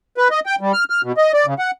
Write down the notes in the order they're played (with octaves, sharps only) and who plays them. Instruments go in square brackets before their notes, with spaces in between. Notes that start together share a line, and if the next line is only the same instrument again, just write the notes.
[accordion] B4
D#5
G5
G3
F6
F6
B2
D#5
D5
C#3
F#5